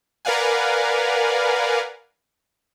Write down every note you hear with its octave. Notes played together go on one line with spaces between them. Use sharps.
A#4 B4 D5 F5 F#5 G#5